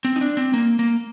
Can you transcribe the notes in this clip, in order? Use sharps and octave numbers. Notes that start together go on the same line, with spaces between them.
C4
D#4
D4
C4
A#3
A#3